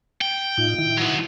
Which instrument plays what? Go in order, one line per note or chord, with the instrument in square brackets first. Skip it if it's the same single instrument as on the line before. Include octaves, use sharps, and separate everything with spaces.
[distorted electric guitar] G5
[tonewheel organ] A2 D#4 F4
D#3 E4
[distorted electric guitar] F#3 B3